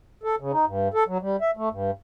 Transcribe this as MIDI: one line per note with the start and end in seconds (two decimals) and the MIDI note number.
0.23 0.35 69
0.40 0.52 49
0.53 0.65 63
0.67 0.88 43
0.94 1.04 69
1.08 1.18 54
1.22 1.36 55
1.41 1.51 76
1.57 1.69 57
1.71 1.91 43